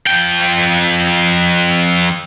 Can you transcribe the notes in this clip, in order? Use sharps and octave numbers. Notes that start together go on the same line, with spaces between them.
F2 G5